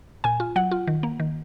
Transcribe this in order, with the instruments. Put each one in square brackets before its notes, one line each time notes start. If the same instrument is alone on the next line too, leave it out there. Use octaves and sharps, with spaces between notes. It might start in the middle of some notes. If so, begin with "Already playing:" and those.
[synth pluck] A#2 G#5
F4
F#3 F#5
F4
D#3
A#3
D#3